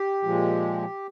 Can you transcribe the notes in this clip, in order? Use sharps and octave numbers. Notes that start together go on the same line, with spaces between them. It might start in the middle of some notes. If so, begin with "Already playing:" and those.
Already playing: G4
A#2 F3 G#3